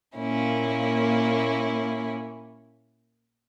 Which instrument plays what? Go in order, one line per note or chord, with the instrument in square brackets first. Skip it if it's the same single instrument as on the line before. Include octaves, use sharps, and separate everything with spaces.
[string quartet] A#2 A#3 C#4 E4